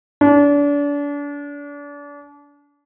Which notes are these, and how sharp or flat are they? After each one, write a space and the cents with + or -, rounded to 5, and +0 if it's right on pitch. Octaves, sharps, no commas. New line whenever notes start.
D4 -35